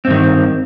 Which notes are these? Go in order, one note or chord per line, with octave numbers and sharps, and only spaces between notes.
G2 D#3 C4